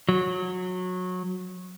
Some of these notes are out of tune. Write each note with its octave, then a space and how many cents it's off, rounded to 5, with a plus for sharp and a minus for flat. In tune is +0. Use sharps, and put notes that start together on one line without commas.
F#3 -20